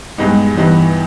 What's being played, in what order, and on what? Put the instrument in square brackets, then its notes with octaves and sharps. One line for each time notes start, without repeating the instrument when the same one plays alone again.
[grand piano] G2 G3 B3 D#4 [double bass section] G#3
[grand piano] G2 G3 B3 D#4 [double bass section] E3